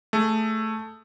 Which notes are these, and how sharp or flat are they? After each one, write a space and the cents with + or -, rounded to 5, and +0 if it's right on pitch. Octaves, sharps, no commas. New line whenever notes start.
A3 +0 G#4 +0